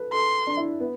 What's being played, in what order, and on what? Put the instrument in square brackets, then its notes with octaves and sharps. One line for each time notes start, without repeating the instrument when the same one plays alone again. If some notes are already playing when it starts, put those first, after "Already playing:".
Already playing: [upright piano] A4 B4
[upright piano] A4 [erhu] C6
[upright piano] D4
E4
B3